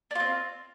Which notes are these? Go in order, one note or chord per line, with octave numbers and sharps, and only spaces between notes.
C4 D4 F4